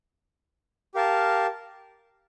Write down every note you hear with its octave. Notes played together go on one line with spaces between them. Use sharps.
G4 A#4 F5 A5